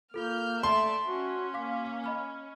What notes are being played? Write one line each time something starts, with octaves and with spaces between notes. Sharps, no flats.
A#3 F4 A4 F6 G6
A3 D5 E5 A5 C6
C#4 F#4
A#3 F5 D6 B6
D#5 B5 F6